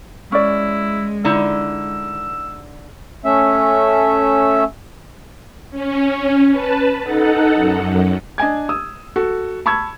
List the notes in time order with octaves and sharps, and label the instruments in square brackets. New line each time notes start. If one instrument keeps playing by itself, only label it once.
[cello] G#3 [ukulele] C#4 D5 [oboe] E4
[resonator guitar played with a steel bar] D3 D#4 E4 [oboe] E6
[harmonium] A3 C#4 E5
[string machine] C#4
B4 A5
D#4 A4 F#5
F#2
[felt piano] D4 D#5 G#5 G#6
D#6 E6
F#4 A4
A5 B5 C#6 E6 G#6